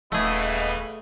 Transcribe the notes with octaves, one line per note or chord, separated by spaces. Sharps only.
D#1 C#3 E3 A3 B3 G#4 D#5